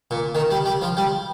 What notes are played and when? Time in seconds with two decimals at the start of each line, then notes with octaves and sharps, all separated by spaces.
0.11 A#2
0.35 D#3
0.51 G3
0.66 G3
0.82 F3
0.97 G3